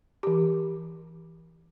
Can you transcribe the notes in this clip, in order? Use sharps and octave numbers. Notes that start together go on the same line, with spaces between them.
E3 G4